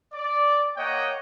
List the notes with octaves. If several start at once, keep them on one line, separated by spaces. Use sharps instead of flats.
D5
A#3 C#5 D#5 F#5 G5